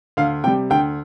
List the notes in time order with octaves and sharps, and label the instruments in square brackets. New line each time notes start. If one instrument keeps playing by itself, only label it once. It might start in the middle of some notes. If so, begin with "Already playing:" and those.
[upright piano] D2 F5
C3 G5
G3
D2 G5